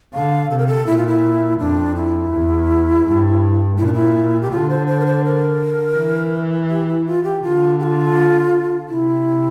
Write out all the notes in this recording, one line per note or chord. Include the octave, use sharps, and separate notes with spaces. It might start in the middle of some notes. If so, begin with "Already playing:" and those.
D3 F5
C3 A4
A#4
A4
A#2 E4
F4
E4
F2 D4
E4
E2
G2
A#2 E4
D4
E4
G4
D3 F4
C5
C5
A#4
C5
A#4
E3
G4
E4
F4
G4
D3 F4
G4
F4
C3 E4